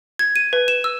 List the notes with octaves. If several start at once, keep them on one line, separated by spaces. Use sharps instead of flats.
G#6
D#7
B4
E7
E6